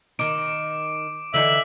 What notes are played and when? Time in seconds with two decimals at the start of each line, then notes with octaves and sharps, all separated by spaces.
0.19 D#3 D#4 D6 D7
1.34 D3 E3 D#4 E5 F#7